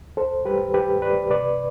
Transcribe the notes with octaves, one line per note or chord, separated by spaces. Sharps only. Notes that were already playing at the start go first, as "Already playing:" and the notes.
Already playing: D2
C2 A4 C5
G3 G4 B4
C2 G4 B4
C2 B4 D5
C3 B4 D5